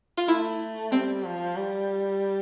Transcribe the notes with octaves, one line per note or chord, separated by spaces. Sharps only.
F4
A3 E4
G3 C4
F3
G3